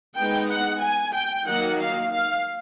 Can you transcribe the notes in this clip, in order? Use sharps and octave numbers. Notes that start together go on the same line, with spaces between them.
G#3 B3 D#4 G5
F#5
G#5
G5
D#3 F#3 A#3 D#4 F#5
F5
F5